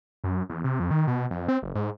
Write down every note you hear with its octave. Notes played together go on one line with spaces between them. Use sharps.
F#2
E2
C3
F2
D#3
B2
F2
C4
F#1
G#2